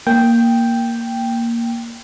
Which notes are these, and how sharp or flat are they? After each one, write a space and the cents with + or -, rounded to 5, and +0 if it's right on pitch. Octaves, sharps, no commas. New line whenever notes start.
A#3 +0 G5 +0